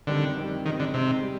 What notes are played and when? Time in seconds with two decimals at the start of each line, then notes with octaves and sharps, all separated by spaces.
0.07 F2 D3 D#3 G3
0.37 F2 D#3 G3
0.65 D#3 G#3 C4 D#4
0.80 D3
0.94 C3 G#3 C4 D#4
1.22 G3